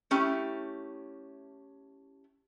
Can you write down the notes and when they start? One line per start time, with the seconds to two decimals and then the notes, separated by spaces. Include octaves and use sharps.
0.11 A3 C#4 E4 G4